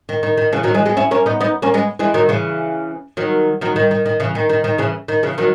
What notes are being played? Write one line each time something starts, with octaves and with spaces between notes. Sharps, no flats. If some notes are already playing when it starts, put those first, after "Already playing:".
D#3
D#3
D#3
C#3 E3
D#3 F#3
E3 G#3
G#3 B3
C#4 E4
A#3 C#4
B3 D#4
B3 D#4
A#3 C#4
G#3 B3
E3 G#3
D#3 F#3
C#3 E3
D#3 F#3
D#3 F#3
D#3
D#3
D#3
C#3 E3
D#3
D#3
D#3
C#3 E3
D#3
C#3 E3
D#3 F#3